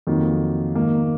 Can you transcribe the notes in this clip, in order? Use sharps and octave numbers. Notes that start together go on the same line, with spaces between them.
F2 D#3 F#3 A#3
G#2 D#3 A#3